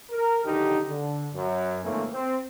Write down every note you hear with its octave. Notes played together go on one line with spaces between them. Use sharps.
A#4
B1 D3 D#3 D#4 G4
D3
F#2
F2 G#2 C#3 E3 A3 A#3
C4